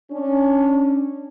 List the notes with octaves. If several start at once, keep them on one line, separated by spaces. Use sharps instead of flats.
C#4 D4